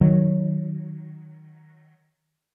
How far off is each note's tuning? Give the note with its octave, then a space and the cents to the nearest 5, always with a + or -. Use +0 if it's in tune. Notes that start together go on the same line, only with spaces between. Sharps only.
D#3 +0 F#3 +0